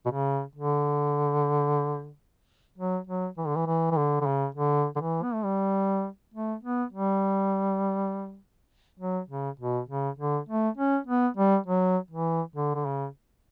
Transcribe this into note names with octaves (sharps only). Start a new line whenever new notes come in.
B2
C#3
D3
F#3
F#3
E3
D3
E3
E3
E3
D3
D3
C#3
D3
D3
E3
B3
A3
G3
A3
B3
G3
F#3
C#3
B2
C#3
D3
A3
C#4
B3
G3
F#3
E3
D3
D3
C#3